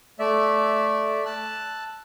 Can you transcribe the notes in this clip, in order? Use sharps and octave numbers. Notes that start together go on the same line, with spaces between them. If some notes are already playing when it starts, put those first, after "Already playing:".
A3 D5 E5
A5 E6 F#6